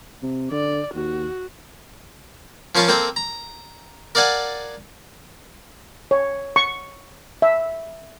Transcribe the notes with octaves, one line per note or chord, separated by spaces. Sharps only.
C3
D3 D5
D#2 F#4
F3 C#4 A#4 F5 A5 C#6
A#3 C4 A4 G5 A#5
A#5
A#4 D5 F5 F#5 G#5 A5
C#5
C#6
E5